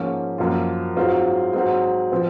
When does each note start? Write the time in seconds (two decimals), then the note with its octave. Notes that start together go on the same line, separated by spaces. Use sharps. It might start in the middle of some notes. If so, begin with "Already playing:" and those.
Already playing: G#2 F3 A#3 C#4 F4
0.38 F#2 F3 A#3 F4
0.97 G#2 F#3 C4 F4
1.53 G#2 F#3 C4
2.12 F3 C4